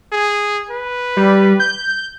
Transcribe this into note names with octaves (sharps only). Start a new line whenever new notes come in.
G#4
B4
G3
G6